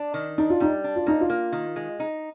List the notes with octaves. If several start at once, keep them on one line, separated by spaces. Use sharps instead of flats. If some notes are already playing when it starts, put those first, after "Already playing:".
Already playing: D4
D#3
D4 D#4
F4
G3 D#4
D4
F4
A#3 D#4
F4
A#3
D#3
G#3
D#4